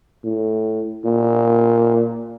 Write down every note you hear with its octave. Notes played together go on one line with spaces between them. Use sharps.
A2
A#2